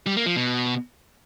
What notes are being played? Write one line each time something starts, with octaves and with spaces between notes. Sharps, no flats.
G3
A#3
F3
B2